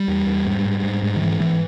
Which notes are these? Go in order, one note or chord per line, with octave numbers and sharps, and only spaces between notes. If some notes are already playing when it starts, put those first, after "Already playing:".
Already playing: G3
E2
E2
G#2
G#2
G#2
G#2
D#3
G#2 E3
G#2 E3